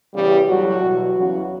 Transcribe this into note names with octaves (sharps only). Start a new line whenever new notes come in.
E2 C#3 E3 G3 G4
A2 F#3 G3 F#4
E2 B2 F#3
E2 C#3 E3 F#3 F#4